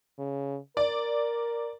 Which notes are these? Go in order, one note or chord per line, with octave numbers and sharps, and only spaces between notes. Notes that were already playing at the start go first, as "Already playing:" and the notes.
C#3
A#4 D5